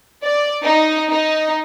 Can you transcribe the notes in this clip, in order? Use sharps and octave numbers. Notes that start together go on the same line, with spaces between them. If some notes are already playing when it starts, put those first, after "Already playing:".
D5
D#4
D#4